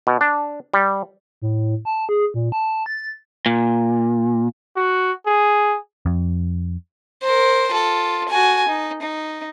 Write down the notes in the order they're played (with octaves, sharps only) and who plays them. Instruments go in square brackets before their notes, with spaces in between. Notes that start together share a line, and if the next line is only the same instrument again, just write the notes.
[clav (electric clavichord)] B2
D4
G3
[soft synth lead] A2
A5
G#4
A#2
A5
A6
[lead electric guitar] A#2
[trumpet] F#4
G#4
[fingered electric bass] F2
[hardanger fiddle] A#4 C5
F4 A4
F#4 G#5
D#4
D#4